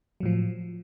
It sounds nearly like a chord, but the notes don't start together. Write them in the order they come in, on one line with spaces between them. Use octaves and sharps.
F#3 A2 F3